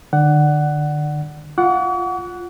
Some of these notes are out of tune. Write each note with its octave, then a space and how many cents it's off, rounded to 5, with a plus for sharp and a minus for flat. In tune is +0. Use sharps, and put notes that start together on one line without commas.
D3 +35 D5 +0 F#5 +15
F4 +5 F#5 +0 C#6 +45